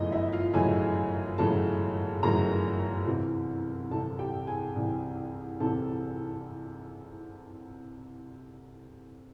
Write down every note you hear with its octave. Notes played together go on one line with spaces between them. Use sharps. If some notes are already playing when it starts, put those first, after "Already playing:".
Already playing: G1 F#2 C#3 E3 A3 D#5
E4 E5
F4 F5
G1 F#2 C#3 E3 A3 G#4 G#5
G1 F#2 C#3 E3 A3 A4 A5
G1 F#2 C#3 E3 A3 A#4 A#5
C2 C3 E3
C2 C3 E3 A4 A5
G4 G5
G#4 G#5
C2 C3 E3
C2 C3 E3 A4 A5